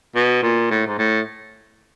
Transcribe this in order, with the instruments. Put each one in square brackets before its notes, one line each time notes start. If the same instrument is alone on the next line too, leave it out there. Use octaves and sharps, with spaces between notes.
[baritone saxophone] B2
A#2
A2
G#2
A2